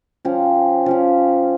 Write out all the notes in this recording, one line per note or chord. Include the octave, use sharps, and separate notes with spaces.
F3 C#4 G4
F3 C#4 G4